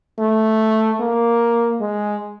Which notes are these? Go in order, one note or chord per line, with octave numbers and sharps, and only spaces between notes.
A3
A#3
G#3